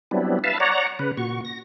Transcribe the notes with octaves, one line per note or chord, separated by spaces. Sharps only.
F#3 G3 B3 C4 D4 E4
B4 E5 F5 A5
C#5 D5 F#5 A#5
C#3 B4
A#2 F#4 C#6
A#6